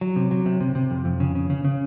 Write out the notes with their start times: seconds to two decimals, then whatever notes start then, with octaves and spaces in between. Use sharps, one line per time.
0.01 F#3
0.16 C3
0.31 F#3
0.46 C3
0.61 C3
0.75 C3
0.91 F2
1.05 F2
1.20 C#3
1.35 C#3
1.50 C#3
1.65 C#3